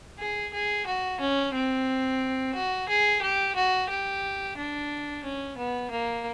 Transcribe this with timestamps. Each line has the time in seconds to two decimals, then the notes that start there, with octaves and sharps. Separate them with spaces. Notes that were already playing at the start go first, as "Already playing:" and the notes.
0.19 G#4
0.53 G#4
0.86 F#4
1.20 C#4
1.53 C4
2.54 F#4
2.89 G#4
3.22 G4
3.55 F#4
3.89 G4
4.57 D4
5.24 C#4
5.57 B3
5.91 A#3